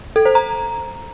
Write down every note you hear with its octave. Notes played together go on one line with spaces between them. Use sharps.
A4
C5
A#5